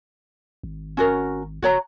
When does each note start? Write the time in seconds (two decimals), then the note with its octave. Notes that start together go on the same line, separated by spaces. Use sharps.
0.63 G#1
0.97 C#4 F#4 A#4
1.62 F#1 F#4 C#5 A#5